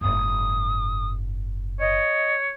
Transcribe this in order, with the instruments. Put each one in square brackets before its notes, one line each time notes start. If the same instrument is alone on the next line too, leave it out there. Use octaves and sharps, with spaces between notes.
[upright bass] F#1 G#2 [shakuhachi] D#6
[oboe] C#5 [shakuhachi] D#5